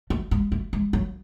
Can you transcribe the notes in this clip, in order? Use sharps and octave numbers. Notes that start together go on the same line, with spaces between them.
A3
G#3
A3
G#3
F#3